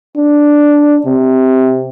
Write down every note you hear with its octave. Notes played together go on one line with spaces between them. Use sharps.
D4
C3